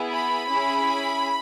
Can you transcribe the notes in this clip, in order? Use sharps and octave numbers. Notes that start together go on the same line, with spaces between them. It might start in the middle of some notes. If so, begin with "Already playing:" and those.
Already playing: B3 E4 G#4
B5
C#4 E4 G#4